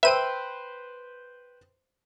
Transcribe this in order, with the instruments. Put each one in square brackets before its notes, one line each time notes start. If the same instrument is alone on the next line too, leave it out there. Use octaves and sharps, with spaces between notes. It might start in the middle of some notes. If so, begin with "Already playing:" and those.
[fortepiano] B4 C5 G5 [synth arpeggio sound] E5 D#7